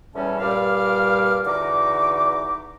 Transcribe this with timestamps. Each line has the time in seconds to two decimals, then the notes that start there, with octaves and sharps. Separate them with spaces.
0.15 E2 A2 G3 C#4 C#5 A5
0.40 G2 A#2 G3 F5 D6 F6
1.46 E2 D3 D#4 F#4 D6